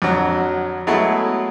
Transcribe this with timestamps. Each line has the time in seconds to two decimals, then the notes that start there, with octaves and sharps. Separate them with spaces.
0.02 F2 D3 F#3
0.87 F#3 G#3 A3 B3 E4 F#4